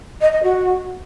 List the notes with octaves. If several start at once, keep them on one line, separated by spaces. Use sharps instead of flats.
D#5
D#5
F#4